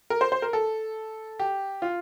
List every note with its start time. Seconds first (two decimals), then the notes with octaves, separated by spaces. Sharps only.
0.10 A#4
0.21 C5
0.32 C5
0.42 A#4
0.53 A4
1.39 G4
1.82 F4